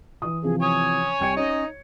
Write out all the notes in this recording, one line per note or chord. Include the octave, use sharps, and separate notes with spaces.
E3 D#6
C3 E3 F3 G#4
C#5 G#5 D#6
C2 G5 G#6 C#7
C#4 D#4 C#5 D#5